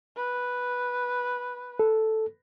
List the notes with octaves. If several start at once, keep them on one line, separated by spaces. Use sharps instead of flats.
B4
A4